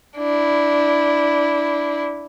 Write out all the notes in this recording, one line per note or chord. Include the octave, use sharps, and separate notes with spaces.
D4 E4